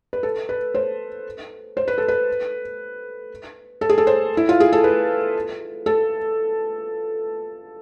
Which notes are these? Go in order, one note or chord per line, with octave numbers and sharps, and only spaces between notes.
B4
A4
B4
C5
C5
B4
A4
B4
A4
G#4
A4
C5
E4
F4
G#4
A4
B4
A4